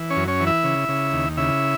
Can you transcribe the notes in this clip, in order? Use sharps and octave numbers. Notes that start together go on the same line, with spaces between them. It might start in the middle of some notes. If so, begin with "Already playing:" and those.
Already playing: E3
C#4 C#5
F#2
C#4 C#5
E3
E4 E5
C#3
C#3
D#2
C#3 E4 E5